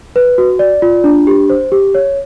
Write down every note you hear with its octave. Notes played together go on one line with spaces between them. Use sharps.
B4
F#4
D5
F4
D4
G4
C5
G4
C#5